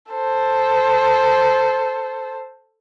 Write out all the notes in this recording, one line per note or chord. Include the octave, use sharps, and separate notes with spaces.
A4 C5